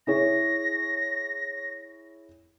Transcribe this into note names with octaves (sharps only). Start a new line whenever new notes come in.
E4 G#4 C#5 A#6